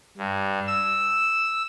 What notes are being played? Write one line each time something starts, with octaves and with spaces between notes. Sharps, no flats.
G2
E6